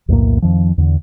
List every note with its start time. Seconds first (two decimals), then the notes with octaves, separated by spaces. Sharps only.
0.08 B1 E2 A2 A#3
0.42 F2 D#3 F3
0.78 E2 D3